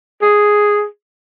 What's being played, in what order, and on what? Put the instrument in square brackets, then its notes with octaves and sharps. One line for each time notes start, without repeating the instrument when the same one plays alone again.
[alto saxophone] G#4